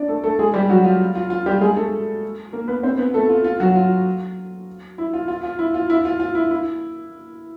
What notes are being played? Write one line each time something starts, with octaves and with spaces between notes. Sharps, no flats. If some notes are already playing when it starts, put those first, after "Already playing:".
Already playing: D4 D5
A3 A4
A3 A4
G#3 G#4
G3 G4
F#3 F#4
F4
F4
F4
G3 G4
G#3 G#4
A3 A4
A#3 A#4
B3 B4
C4 C5
B3 B4
A3 A4
F4
F4
F#3 F#4
F4
E4
F4
F4
F4
E4
F4
E4
F4
F4
E4
E4